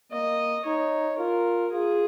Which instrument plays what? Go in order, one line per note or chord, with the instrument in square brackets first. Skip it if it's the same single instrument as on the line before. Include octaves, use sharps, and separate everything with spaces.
[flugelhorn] A#3 [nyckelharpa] D#5
[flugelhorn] D#4 [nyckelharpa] C#5
[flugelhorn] F4 [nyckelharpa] A#4
[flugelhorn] F4 [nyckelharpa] G#4